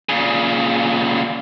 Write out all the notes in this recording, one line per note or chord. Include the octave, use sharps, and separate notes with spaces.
A#2 C#3